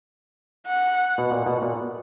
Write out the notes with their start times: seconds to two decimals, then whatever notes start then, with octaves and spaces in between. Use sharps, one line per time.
0.67 F#5
1.18 B2
1.31 A#2
1.46 B2
1.62 A#2